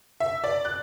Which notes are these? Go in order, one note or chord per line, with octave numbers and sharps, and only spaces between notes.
E5
D5
F#6